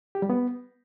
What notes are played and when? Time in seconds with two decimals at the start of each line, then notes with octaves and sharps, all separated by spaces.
0.15 G4
0.22 G3
0.30 B3